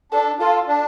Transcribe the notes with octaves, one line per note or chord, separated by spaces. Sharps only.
D4 A4
F4 A4
D4